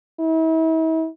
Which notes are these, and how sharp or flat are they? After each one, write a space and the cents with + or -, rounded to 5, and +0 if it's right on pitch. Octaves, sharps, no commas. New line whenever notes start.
E4 -40